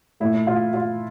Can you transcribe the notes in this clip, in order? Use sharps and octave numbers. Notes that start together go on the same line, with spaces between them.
A#2 A3 E4
F4
F4